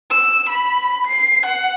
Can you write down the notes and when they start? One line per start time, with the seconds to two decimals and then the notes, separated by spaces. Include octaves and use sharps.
0.11 E6
0.49 B5
1.07 C7
1.46 F#5